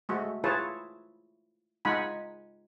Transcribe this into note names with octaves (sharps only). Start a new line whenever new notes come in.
G#3 A3 F#4
E4 F4 G#4 B4 C#5 A5
G#3 D#4 F4 F#5 G#5 B5